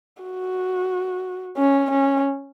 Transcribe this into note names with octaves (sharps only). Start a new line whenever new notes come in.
F#4
C#4
C#4